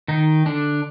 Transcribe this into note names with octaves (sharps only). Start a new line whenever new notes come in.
D#3 D#4
D3 D4